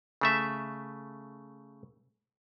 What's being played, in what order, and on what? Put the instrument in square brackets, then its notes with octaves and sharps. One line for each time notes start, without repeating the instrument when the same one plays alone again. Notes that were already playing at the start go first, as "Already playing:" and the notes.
[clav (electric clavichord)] C#3 A3 E5